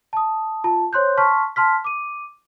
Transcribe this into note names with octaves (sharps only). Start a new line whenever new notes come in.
A5 D#6
F4 A5
C5 C#5 C6 F#6 G6
A5 C6 C#6 F6 B6
A5 C6 F6 B6
D6 D#7